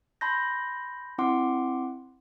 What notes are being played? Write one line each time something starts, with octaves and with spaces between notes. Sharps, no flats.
A5 B5 C6 G6 A#6
C4 E4 F#5 C6 D6